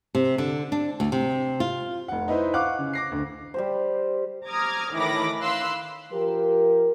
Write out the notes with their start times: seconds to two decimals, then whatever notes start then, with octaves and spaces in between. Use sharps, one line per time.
0.15 C3
0.38 D3
0.72 D4
1.00 D2
1.12 C3
1.60 F4
2.08 F1 F#5
2.28 D#4 E4 B4 C5
2.54 F5 F#5 C#6 D6 F#6
2.79 C#3
2.93 D6 A#6 C7
3.11 D2
3.54 G3 G4 C5
4.48 A#5 D6 D#6 F6 G#6
4.93 A2 D#3 E3 B5 D6 A#6
5.42 F5 B5 C6 E6 F#6
6.11 F3 G4 A#4